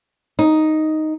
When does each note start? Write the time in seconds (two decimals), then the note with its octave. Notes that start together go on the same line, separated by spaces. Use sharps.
0.39 D#4